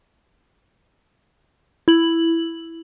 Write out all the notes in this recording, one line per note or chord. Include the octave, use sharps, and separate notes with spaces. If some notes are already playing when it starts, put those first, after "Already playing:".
E4 F#7